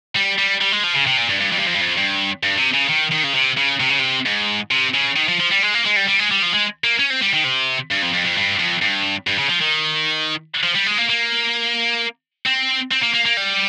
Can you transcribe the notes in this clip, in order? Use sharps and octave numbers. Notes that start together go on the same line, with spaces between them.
G3
G3
G3
G#3
F3
C#3
C3
A#2
G2
G2
F2
G2
F2
G2
F2
G2
G2
C3
C#3
D#3
D#3
C#3
C3
C#3
C3
C#3
C3
G#2
C3
C#3
D#3
F3
F3
G3
G#3
A#3
G#3
G3
G3
G#3
G3
F3
G#3
A#3
C#4
C4
G3
D#3
C3
G2
F2
F2
F2
G2
F2
G2
G2
C#3
F3
D#3
F3
G3
G#3
A#3
A#3
C4
C4
A#3
A#3
A#3
G3